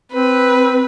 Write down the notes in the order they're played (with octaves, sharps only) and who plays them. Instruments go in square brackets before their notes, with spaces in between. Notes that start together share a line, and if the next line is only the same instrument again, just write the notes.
[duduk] C4 [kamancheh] B4